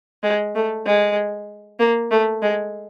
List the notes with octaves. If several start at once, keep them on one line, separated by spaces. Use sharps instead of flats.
G#3
A3
G#3
A#3
A3
G#3